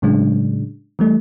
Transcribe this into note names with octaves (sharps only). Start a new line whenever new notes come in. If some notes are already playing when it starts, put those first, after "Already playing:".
A2 C#3 F#3 G#3 D4
E3 G3 A3